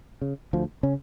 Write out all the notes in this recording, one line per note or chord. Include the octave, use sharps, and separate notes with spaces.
C#3
D2 F3
C#3 C#4